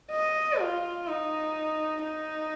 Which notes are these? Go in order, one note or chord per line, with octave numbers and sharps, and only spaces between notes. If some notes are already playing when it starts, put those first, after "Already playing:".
D#5
F4
D#4
D#4